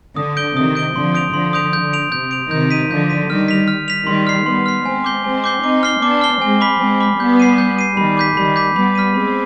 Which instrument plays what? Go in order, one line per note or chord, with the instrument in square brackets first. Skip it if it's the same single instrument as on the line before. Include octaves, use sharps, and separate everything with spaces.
[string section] D3 [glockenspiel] D#6
[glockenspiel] G6 D7 G7
[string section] C3 D#3 [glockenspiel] D#6
[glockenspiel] G6 D7 G7
[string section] D3 F3 [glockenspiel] C6
[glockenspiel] D#6 G6 D7 F7
[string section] D3 F3 [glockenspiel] C6
[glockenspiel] D#6 G6 D7 F7
[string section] D3 [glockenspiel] G6
[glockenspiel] D7 F7
[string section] C3 [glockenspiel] G6
[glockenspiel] D7 F7
[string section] C3 D#3 [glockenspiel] G6
[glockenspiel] B6 D#7
[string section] D3 F3 [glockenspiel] G6
[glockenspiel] B6 D#7
[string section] D#3 G3 [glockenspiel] F6
[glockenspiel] B6 F7
F6
B6 F7
[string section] D#3 G3 [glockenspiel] C6
[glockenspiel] F6 C7
[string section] G3 B3 [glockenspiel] C6
[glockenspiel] F6 C7
[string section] G#3 C4 [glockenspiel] G#5
[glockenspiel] D6 G6 C7 G7
[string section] G#3 C4 [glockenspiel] G#5
[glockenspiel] D6 G6 C7 G7
[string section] C4 D#4 [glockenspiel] D6
[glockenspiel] F6 C7 G7
[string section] B3 D4 [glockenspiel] D6
[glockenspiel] F6 C7 G7
[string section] G#3 C4 [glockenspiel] G#5
[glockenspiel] B5 D6 F6 B6
[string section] G#3 C4 [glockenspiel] G#5
[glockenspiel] B5 D6 F6 B6
[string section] G3 B3 [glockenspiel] G6
[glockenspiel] C7 D#7
G6
C7 D#7
[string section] D#3 G3 [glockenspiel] B5
[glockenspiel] D6 G6 B6
[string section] D#3 G3 [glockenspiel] B5
[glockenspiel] D6 G6 B6
[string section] G3 B3 [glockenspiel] B5
[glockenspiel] F6 B6 D#7
[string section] G#3 C4 [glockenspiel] B5